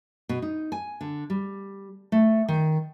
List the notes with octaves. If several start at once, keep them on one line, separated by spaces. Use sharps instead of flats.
B2
D#4
G#5
D3
G3
A3
D#3